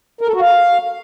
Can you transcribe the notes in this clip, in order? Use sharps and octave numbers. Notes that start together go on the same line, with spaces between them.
A#4
A4
F#4
F5